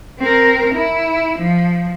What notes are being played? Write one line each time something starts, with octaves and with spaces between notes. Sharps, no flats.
C4 A#4
E4
F3